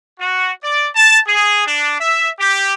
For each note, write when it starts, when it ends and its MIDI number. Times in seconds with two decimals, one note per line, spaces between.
0.19 0.51 66
0.63 0.87 74
0.96 1.18 81
1.26 1.65 68
1.66 1.96 62
1.99 2.29 76
2.39 2.73 67